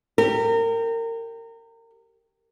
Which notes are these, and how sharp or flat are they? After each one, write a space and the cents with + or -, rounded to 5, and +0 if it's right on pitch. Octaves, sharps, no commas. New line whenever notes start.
G4 +0 A#4 -30